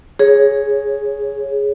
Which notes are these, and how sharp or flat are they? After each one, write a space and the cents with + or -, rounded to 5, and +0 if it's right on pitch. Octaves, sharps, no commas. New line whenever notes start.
G#4 +0 C#5 +0